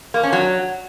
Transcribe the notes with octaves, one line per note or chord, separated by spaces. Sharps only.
A#3
C#4
F#3